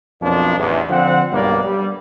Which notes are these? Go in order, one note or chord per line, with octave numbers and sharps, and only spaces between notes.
B1 F2 F3 A#3 D4
A1 E2
D3 F3 C4 F#5
B1 G2 A#3 B3 D5
G3